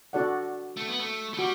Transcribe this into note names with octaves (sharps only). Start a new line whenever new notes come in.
D4 F#4 A4 D5 F#5
A3
B3
A3
A3
G3 F#4